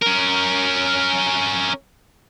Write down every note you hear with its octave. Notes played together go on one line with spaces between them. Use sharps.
C#4 A#4